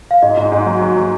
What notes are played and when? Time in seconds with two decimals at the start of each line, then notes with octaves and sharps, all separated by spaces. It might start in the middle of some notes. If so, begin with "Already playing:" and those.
0.11 F5
0.22 G#2 D#5
0.37 G#2
0.52 G#2
0.66 F#3
0.81 F#3
0.96 F#3